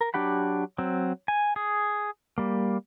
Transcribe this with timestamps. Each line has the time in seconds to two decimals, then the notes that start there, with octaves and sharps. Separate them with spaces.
0.01 A#4
0.14 F#3 D4 G4 F#5 B5
0.78 F#3 C4
1.28 G#5
1.56 G#4
2.38 G3 A#3